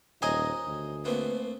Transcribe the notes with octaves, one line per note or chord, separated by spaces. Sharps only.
D#1 C5 C#5 D#5 F#5 G#5 A#5
D2
A3 A#3 C4 B4